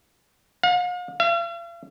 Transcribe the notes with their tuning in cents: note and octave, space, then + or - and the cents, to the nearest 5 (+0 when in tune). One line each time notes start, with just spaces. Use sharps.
F5 +45
F5 -45